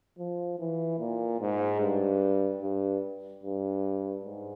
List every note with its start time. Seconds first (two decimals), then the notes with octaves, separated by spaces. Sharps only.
0.18 F3
0.59 E3
0.99 A#2
1.40 G#2
1.81 G2
2.61 G2
3.43 G2
4.25 G#2